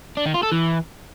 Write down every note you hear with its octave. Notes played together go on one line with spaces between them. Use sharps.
D4
D#3
F4
A4
E3